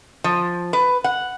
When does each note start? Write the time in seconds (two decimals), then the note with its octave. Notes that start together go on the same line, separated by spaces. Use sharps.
0.24 F3
0.73 B4
1.04 F#5